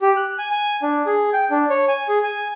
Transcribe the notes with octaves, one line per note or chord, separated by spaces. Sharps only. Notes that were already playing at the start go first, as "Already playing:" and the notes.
G4
F#6
G#5
G#5
D4
G#4
G5
D4
C#5
G#5
G#4
G#5